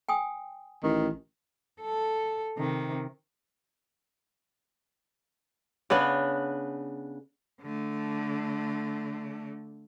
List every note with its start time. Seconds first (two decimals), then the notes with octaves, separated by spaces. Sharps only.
0.09 G5 G#5 D#6
0.83 A1 D#3
1.82 A4
2.57 C3 D#3
5.90 C#3 B3 D4 B4
7.62 D3 A3